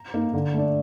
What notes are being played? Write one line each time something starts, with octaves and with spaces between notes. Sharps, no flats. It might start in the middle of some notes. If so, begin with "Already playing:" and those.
Already playing: A#5
A#3 D#4
D3
A3 D4